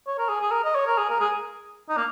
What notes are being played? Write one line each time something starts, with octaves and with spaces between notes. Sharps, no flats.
C#5
A#4
G#4
G#4
A#4
D#5
C#5
A#4
G#4
A#4
G#4
D#4
A#3